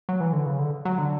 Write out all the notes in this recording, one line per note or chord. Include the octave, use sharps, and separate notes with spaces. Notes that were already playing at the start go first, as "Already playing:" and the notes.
F#3
E3
D3
C#3
D3
F#3
D3